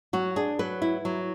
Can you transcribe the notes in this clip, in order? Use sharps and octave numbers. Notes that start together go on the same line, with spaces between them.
F#3 F#4
D4 G#4
F#3 B4
E4
F#3